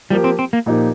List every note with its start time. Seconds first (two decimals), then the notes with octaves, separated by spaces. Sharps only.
0.10 F3 G3 A#3 G4
0.24 C4
0.39 C4
0.53 A#3
0.66 A#2 F3 A#3 D#4 G4